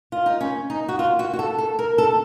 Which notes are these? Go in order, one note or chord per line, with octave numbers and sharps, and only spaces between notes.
F4
D#4
C#4
D#4
F#4
F4
F#4
F#4
A4
A4
A#4
A4